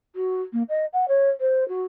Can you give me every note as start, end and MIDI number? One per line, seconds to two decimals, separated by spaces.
0.15 0.41 66
0.53 0.63 58
0.69 0.85 75
0.93 1.08 78
1.08 1.30 73
1.40 1.67 72
1.68 1.84 66